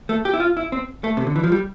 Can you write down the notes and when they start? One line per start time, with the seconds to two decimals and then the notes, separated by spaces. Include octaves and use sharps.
0.09 A3
0.25 G4
0.34 E4
0.40 F4
0.57 E4
0.72 C4
1.04 A3
1.17 C3
1.27 D3
1.36 E3
1.44 F3
1.52 G3